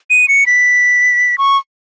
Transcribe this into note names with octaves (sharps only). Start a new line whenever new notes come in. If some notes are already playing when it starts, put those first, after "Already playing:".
D#7
C#7
B6
C#6